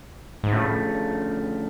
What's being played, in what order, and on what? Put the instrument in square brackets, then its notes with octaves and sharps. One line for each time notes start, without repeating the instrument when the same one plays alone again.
[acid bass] G#2
[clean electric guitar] D2 C#3 F3 A3 [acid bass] A2